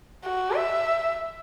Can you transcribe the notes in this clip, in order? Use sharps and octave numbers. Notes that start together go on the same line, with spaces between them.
F#4
E5